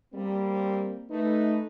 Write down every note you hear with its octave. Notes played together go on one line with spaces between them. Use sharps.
G3 A#3 C4
A3 D#4 B4